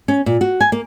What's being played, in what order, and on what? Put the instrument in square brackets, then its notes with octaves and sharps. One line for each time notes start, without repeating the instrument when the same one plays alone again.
[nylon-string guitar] C#4
A#2
F#4
G#5
A#3